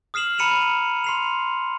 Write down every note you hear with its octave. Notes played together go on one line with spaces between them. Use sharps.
D#6 F6 C7 E7 F#7
A#5 B5 C#7 D#7 F7 F#7
C6 C7 F7